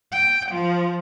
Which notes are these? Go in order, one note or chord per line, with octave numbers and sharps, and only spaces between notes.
G5
F3